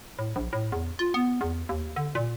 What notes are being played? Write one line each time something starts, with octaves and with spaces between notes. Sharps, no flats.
A2
A#1
A2
E2
F4
B3
E2
D#2
D3
A#2